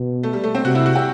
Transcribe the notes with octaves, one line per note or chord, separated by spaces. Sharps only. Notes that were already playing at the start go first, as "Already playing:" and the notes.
Already playing: B2
A3
G3
A3
C4
C3 F#4
E4
F#4
G4